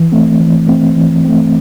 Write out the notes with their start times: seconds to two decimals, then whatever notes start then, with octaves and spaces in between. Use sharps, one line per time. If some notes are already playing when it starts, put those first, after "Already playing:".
Already playing: E3
0.12 A3 C4
0.40 E3
0.67 A3 C4
0.96 E3
1.25 A3 C4